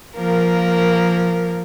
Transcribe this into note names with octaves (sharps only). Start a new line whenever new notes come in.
F3 A#3 A#4